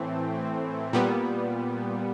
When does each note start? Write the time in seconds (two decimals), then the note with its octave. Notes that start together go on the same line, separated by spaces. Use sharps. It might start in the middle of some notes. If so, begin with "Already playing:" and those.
Already playing: A2 E3 A3 C4
0.93 A#2 G3 B3